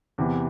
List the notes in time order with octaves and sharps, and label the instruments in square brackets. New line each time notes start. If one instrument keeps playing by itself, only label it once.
[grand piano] E2 C3 E3